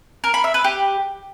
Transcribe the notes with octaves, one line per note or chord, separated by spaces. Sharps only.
A#4
B5
E5
B4
G4